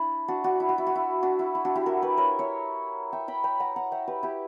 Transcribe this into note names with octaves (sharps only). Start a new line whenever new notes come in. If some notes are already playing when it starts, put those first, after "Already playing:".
Already playing: D4 E4
D4 F#4
D4 F#4
E4
F#4
E4
F#4
E4
D4 F#4
E4
E4
D4 F#4
E4 G4
F#4 A#4
G4 B4
A#4 C#5
C#5 E5
E5 G5
G5 B5
G5 B5
F#5 A#5
F#5 A#5
E5 G5
G4 B4
E4 G4